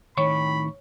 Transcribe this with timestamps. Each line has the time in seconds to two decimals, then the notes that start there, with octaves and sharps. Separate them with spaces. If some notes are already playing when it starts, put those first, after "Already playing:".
0.18 A2 D#3 C#5 G5 B5 C#6